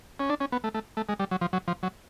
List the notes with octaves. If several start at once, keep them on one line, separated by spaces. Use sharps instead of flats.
C#4
D4
C#4
B3
A3
A3
A3
G#3
G3
F#3
F3
F#3
F3
F#3